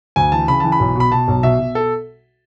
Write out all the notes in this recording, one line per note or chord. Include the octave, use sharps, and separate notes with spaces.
D2 G#5
E3 A5
C#3 B5
E3 A5
B5
B1
B2 B5
B2 A5
B1
B2 E5
B2
A4